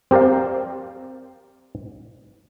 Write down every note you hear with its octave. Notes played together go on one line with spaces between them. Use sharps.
C4 G4 A#4 D5 F5